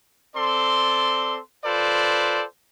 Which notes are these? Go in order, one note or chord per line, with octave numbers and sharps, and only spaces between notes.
C4 A4 D5 C6
F4 A4 B4 C5 D5